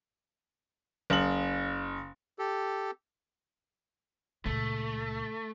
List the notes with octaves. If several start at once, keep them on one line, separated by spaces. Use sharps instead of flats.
F#1 F#7
G4 A4
C#2 A#2 A3